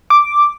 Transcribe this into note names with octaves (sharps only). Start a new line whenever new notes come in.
D6